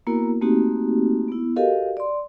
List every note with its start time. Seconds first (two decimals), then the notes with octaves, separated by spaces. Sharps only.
0.07 A#3 B3 E4 F#4 A#4
0.41 A3 A#3 C4 D#4 F#4 G4
1.28 B3 E4
1.56 F#4 G4 A4 A#4 D#5 F5
1.97 D5 C6